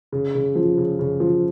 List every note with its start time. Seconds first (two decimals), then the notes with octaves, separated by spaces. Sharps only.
0.12 C#3
0.35 C#3
0.55 F3
0.78 C#3
0.99 C#3
1.20 F3